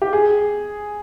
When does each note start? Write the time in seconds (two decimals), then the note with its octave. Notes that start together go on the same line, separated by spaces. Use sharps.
0.02 G4
0.13 G#4